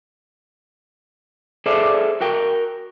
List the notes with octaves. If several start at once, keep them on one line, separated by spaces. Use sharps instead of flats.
G#4 A4 C5 D5 E5
F#4 A#4 G5